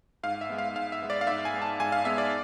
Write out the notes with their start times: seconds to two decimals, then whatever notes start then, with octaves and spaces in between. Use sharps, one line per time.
0.23 G#2 F5
0.41 E5
0.50 G#3 B3
0.58 F5
0.76 G#2 F5
0.92 E5
1.02 G#3 B3
1.10 D5
1.21 F5
1.27 G#2 E5
1.45 G#5
1.54 G#3 B3
1.62 A5
1.80 G#2 G#5
1.92 F5
2.05 G#3 B3 E5
2.18 D5